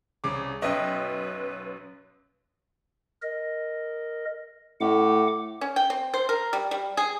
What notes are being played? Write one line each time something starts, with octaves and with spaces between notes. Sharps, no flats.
C2 C#3 D6
B1 F#2 B4 D#5 E5 G5
A#4 D#5
A2 F#5 D6
C#4
G5
C4
C5
A#4
G3
G3
G#4